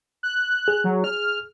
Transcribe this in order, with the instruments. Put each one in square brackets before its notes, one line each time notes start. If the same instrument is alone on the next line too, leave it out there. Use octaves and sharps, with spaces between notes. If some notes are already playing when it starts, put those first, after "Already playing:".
[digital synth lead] F#6
[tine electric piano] G#4
[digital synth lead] F#3
F6